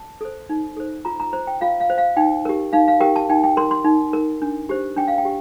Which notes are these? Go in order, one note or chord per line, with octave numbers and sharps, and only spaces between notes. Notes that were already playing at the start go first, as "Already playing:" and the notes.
Already playing: A5
A4 C5
D#4
A4 C5
F4 A#5
A#5
C5 A#5
G5
F4 F5
F5
C5
F5
D#4 G5
G4 A#4
D#4 F5
F5
G4 A#4 G5
A5
D#4 G5
G5
A#4 C6
C6
D#4
A#4
D4
G4 C5
D4 G5
F5
G5
G4